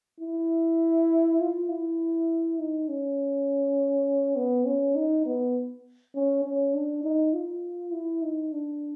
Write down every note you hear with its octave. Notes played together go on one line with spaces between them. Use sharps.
E4
F4
E4
D#4
C#4
B3
C#4
D#4
B3
C#4
C#4
D4
D#4
F4
E4
D#4
D4